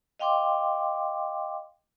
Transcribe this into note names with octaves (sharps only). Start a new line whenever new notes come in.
D#5 F5 G5 C6 D6